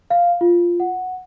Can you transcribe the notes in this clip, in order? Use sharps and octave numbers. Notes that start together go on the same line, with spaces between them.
F5
F4
F#5